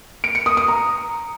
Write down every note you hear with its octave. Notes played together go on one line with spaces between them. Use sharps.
D7
C#7
D#6
D#6
A#5